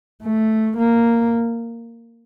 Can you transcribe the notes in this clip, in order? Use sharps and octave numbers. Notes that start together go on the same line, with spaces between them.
A3
A#3